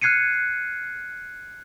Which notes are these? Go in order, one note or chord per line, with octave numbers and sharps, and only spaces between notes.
F6 F#6 G#6 C7 C#7 D#7